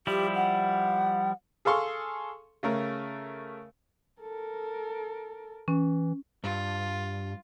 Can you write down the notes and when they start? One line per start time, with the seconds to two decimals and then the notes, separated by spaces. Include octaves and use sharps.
0.07 F3 G3 E4 G4
0.35 F#5
1.65 G#4 A4 F5 C6 C#6
2.63 C#3 A3 A#4
4.21 A4 A#4
5.68 E3 C#4
6.44 G2 F4